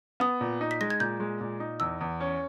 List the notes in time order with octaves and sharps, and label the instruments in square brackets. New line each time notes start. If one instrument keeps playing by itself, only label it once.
[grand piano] B3 [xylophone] D#6
[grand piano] A#2
D#4
[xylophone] B6
[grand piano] G#3 [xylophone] A#6
[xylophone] G#6
[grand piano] A#2 [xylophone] G6
[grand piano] G#3
A#2
D#4
[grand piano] E2 [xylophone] E6
[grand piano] E2
C#4